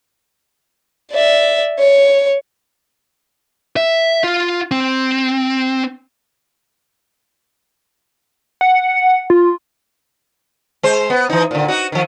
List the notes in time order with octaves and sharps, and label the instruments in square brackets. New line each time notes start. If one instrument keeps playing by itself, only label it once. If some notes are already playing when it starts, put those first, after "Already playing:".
[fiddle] D5 E5
C#5
[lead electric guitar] E5
F4
C4
[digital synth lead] F#5
F4
[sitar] G#3 C5
B3
E3 D#4
A#2 D3
D#4 F#4
D#3 F3